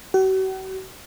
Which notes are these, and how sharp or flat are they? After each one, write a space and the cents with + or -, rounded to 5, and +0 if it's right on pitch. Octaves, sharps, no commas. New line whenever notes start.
F#4 +45